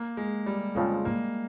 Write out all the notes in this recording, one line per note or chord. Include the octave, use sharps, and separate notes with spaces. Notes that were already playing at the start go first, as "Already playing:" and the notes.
Already playing: A#3
G#3
G3
F2 C#3 F3 G#3 C4
A#3